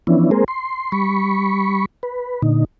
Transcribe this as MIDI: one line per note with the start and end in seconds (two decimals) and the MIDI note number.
0.07 0.30 52
0.07 0.30 53
0.07 0.30 59
0.07 0.30 61
0.07 0.30 62
0.07 0.30 64
0.31 0.44 56
0.31 0.44 58
0.31 0.44 60
0.31 0.44 68
0.31 0.44 70
0.31 0.44 72
0.48 0.92 84
0.92 1.85 55
0.92 1.85 83
0.92 1.85 85
2.03 2.42 71
2.42 2.65 46
2.42 2.65 50
2.42 2.65 63